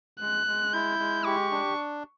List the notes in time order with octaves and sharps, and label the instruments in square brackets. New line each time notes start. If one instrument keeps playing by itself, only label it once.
[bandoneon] G#3 [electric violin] F#6
[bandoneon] G#3
[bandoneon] E4 [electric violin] G6
[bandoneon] G#3
[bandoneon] G4 [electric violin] C#6
[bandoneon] D4